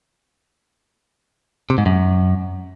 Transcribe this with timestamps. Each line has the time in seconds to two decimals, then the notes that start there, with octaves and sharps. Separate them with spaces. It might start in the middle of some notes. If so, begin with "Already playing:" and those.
1.70 C3
1.78 G#2
1.86 F#2